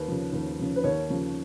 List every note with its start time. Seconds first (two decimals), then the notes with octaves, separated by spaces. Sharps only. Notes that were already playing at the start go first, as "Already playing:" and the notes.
Already playing: D#2 B4
0.08 C#3 F3
0.33 D#2
0.59 C#3 F3
0.76 B4
0.84 D#2 C#5
1.10 C#3 F3